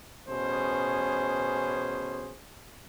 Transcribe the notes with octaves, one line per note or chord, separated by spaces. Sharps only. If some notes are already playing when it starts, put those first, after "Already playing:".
A1 B2 C#4 G#4 C5